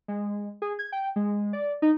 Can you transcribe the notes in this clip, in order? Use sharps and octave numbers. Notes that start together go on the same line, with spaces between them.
G#3
G#4
G#6
G5
G#3
D5
D#4